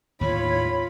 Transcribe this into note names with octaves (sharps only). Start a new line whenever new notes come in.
D#2 A2 D#3 F4 C#5 B5